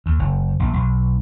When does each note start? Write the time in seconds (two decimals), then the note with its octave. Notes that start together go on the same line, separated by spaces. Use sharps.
0.06 D#2
0.19 F#1
0.60 A#1
0.73 B1